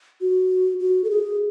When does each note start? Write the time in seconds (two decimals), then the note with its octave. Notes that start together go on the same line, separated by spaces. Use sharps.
0.21 F#4
0.80 F#4
1.04 A4
1.10 G#4